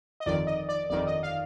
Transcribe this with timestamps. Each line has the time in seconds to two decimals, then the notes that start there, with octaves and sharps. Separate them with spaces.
0.20 D#5
0.26 G1 F2 D#3 D5
0.47 D#5
0.69 D5
0.90 G1 F2 D#3 D5
1.07 D#5
1.23 F5